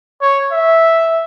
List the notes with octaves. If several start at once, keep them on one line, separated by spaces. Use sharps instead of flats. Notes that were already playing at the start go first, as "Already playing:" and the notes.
C#5
E5